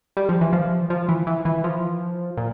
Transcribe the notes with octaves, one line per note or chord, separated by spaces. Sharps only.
G3
F3
E3
F3
F3
E3
E3
E3
F3
A#2